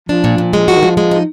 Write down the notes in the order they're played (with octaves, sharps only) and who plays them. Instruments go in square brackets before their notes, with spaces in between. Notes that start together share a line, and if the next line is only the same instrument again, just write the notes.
[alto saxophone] F3 [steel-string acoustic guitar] D4
[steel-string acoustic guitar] A#2
A#2
G#3
[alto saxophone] F3 [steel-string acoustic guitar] F#4
[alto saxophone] D#3
[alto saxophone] F3 [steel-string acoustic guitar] G#3
[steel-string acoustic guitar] G#3
D#4